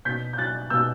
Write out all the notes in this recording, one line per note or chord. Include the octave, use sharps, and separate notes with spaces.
B2 G6 B6
G6
F#3 F#6 A6
B2 E6 G6